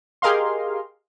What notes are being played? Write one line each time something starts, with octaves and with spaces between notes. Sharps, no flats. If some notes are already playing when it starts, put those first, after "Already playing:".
G4 G#4 A#4 D#5 F5 C6